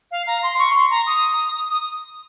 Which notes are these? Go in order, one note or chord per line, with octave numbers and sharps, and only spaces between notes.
F5
A#5
C6
C#6
C6
A#5
D#6
D#6